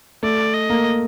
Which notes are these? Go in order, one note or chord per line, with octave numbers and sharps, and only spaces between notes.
A3 D5
D#5
A#3